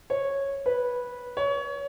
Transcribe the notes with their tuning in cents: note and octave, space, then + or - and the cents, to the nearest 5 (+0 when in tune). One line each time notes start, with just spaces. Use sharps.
C#5 -10
B4 -10
C#5 +25